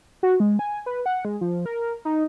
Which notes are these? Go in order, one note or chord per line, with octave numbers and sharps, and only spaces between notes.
F#4
G#3
G#5
B4
F#5
G#3
F3
A#4
D#4